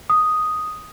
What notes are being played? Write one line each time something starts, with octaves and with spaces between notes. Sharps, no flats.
D#6